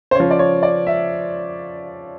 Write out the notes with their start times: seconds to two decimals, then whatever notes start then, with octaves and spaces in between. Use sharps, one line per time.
0.11 C5
0.15 C#3 F3 C#5
0.31 D5
0.39 C#5
0.63 D5
0.87 E5